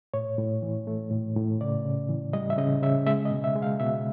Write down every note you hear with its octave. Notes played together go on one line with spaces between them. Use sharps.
A2 C#5
A2
E3
A3
A2
A2
C#3 D5
C#3
E3
G3 D#5
E5
C#3 D#5
C#3 E5
G#3 E5
D#5
B2
E5
G#3
F5
B2 E5